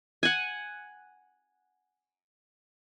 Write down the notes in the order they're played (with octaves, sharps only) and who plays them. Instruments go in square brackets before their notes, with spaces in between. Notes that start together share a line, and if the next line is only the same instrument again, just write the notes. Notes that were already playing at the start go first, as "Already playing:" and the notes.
[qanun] F#5 G#5